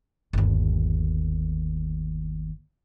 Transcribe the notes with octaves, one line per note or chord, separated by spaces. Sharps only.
G1 D#2